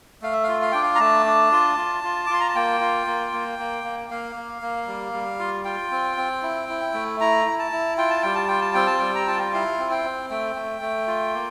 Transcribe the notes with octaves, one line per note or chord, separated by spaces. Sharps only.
A3 F5
E5
F4 F5
F5
D4 G5
F5
A#5
A3 A5
D4
F4
F4
F4
D6
F4 C6
A#5
A5
A#3 G5
F4
A#3
A#3
A#3
A#3
A#3 F5
A#3
A#3
G3
G3
F4
F4 G5
C4
C4
E4
E4
A3
E4 A#5
E4
A5
E4
F4 G5
A5
G3 G5
A5
F4 G5
A5
C4 G5
A5
G3 G5
A#5
F4 A5
G5
E4 F5
C4
G5
C4
A3 G5
A3
A3
F4
A#3